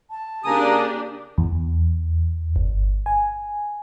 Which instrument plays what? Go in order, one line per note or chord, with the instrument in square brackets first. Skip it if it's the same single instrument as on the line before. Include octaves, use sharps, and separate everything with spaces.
[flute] A5
[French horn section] C#3 A#3 [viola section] D4 G4 [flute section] G#5 A#5 D#6
[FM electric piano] E2
G1
G#5